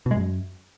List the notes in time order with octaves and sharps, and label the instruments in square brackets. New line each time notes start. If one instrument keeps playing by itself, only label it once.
[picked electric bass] B2
G#3
F#2